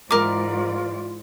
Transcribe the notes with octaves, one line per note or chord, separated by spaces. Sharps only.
G#2 E3 F4 A#4 D5 D6